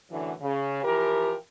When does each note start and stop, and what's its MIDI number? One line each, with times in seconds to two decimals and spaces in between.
0.11 0.32 42
0.11 0.32 45
0.11 0.32 50
0.11 0.32 52
0.42 0.84 49
0.84 1.34 52
0.84 1.34 53
0.84 1.34 67
0.84 1.34 70